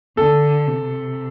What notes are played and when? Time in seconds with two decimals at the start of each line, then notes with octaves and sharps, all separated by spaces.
0.17 D3 A4
0.67 C3